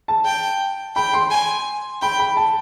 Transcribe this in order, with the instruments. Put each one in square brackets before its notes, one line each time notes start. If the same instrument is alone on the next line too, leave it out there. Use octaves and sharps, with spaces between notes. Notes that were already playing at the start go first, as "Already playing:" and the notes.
[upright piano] A5
[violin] G5
[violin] G5 [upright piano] B5
[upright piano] C6
[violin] G#5
[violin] G5 [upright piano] B5
[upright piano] B5
A5